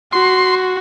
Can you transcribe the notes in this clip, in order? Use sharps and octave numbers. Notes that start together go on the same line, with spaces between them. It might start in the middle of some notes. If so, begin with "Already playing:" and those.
F#4 C6